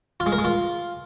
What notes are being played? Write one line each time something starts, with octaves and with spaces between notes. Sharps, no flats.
F4
G#3
A#4
G#3
F4